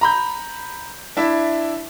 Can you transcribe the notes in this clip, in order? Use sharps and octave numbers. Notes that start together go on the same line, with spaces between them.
A#5 B5 G6
D4 E4 E5